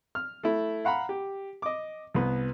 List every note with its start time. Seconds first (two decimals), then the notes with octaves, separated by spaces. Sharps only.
0.15 F6
0.43 A3 E4
0.85 F5 F#5 A#5 B5
1.09 G4
1.62 D#5 D6
2.14 C2 B3